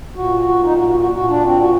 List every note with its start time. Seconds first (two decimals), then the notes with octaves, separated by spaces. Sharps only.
0.16 A#2 F#4
0.40 F#4
0.63 D#4
0.75 F#4
0.87 F#4
0.99 F#4
1.11 A#2 F#4
1.28 D4
1.44 C4
1.59 F#4